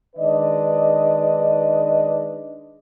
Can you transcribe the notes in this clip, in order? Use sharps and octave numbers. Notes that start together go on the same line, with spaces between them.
D#3 G#3 D4 B4 D5 D#5